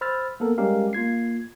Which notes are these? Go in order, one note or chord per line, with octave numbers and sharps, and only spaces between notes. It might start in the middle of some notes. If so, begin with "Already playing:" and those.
C5 B5 E6 F6 A6
A#3 B3 A4 A#4
G3 G#3 C#4 G4 A#4 F5
A#3 F4 G#6 C7